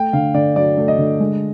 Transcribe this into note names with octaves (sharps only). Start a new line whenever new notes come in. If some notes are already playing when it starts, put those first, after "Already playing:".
Already playing: A3 G5
D3 F5
D3 D5
F#3 D5
A3
D#5
D3
G#3